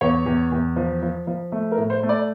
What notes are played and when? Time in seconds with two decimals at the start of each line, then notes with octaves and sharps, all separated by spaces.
0.01 E2 C#5
0.26 E2
0.52 E2
0.76 F3
1.02 F3
1.27 F3
1.52 A3
1.72 A#4
1.77 A2
1.90 C5
2.03 A3
2.09 D5